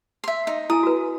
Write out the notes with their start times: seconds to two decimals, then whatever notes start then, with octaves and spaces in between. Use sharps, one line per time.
0.24 E5 C6
0.47 D#4
0.70 E4 G#5 D#6
0.83 F#4 B4